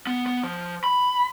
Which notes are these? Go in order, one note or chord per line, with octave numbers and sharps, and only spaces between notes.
B3
B3
F3
B5